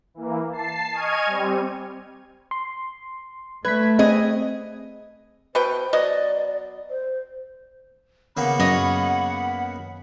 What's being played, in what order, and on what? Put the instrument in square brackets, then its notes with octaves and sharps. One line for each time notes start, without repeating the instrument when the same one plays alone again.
[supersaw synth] E3 A#3
A5 C7
D#5 G#5 C#6 F6 G#6 D#7
G3 C4
[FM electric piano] C6
[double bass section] A3 [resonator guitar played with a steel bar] B4 [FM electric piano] G#6 B6
[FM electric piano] C4 [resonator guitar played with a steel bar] G#4 D#5
[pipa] B2 B4 G5 [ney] C5
[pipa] F#3 B3 D#5 [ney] D5
[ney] C5
[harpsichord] C#3 A#3 B3 [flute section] F#5 B5
[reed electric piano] F#2 [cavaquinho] C#5 D#5